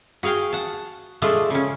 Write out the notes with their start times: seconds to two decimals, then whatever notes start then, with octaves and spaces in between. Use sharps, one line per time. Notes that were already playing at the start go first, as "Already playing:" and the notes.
0.23 F#4 G#4 F5 G5
0.53 F#5 A5
1.22 F3 G#3 A3 D4 F4
1.50 C#3 C#4